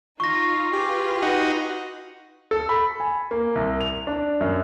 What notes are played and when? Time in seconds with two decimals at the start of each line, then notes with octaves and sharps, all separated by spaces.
0.20 D#4 F4 C#6 A#6
0.73 F4 G4 G#4 B4
1.22 D#4 F#4
2.51 A4
2.69 B5
3.00 G#5
3.31 A#3
3.55 C2
3.81 F7
4.07 D4
4.41 F#2